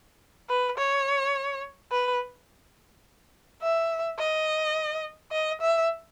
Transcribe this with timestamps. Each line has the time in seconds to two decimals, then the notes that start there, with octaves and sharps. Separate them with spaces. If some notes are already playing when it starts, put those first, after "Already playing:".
0.50 B4
0.78 C#5
1.92 B4
3.62 E5
4.18 D#5
5.32 D#5
5.61 E5